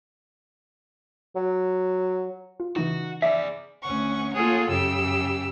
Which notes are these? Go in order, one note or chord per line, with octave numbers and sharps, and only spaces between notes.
F#3
F4
C#3 E3 D#4 F#4
G#4 D5 E5
D2 C#4 F#5 C#6
A#3 F4 G#4 A4 C#5 F#5
F#2 C#3 G4 E6